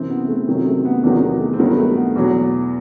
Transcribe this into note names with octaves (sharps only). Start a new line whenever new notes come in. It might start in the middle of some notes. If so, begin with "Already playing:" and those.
Already playing: F#2 C3 E3 C4
B3
A3
F#2 C3 D#3 F#3 C4
A3
B3
E2 C3 D#3 F#3 B3
B3
A3
C4
G2 D#3 F#3 B3
A3
B3
E2 B2 F#3